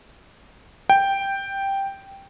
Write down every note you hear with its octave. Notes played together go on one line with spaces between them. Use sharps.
G5